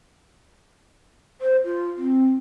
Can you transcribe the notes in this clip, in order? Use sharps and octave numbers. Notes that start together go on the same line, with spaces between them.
C5
F4
C4